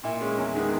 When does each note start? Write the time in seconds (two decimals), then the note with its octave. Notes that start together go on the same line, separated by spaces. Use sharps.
0.04 A#2 E4
0.21 G#3 C#4
0.38 E2
0.55 D#3 G#3 B3